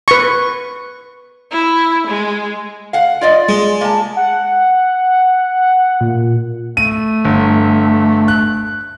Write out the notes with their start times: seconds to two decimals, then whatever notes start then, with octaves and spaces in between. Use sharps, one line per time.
0.08 B4 C#6
1.52 E4
2.08 G#3
2.93 F5 F#5
3.21 F4 D5 D#5
3.49 G#3
3.81 A#3 A5
4.16 F#5
6.01 A#2
6.77 A3 D#7
7.25 G1
8.28 F#6